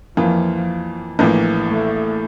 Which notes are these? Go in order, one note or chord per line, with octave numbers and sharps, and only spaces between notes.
F2 E3 F3 A#3 F4
A#1 A2 E3 A#3
A3